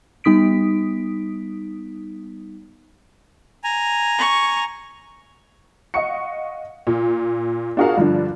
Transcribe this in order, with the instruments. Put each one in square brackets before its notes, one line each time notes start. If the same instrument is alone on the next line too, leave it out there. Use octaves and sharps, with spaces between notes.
[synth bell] G3 B3 D#4 D#6 B6 D7
[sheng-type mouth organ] G#5 A#5
[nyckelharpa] C#6
[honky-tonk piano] D#5 F5 F#5 C#6 C#7
A#2
D4 F4 F#4 G#4 A#4 F5
G2 D3 F3 D4